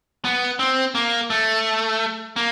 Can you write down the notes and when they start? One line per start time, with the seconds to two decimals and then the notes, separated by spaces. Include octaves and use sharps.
0.25 B3
0.59 C4
0.95 A#3
1.30 A3
2.36 A#3